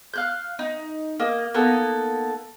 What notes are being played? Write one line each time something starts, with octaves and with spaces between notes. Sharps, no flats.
F5 F#6 G6
D#4
A#3 D#5
A#3 B3 D#4 A4